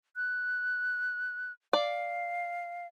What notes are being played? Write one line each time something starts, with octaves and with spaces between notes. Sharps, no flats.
F#6
D5 F5